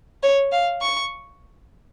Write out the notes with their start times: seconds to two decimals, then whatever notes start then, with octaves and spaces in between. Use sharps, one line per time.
0.23 C#5
0.52 F5
0.82 C#6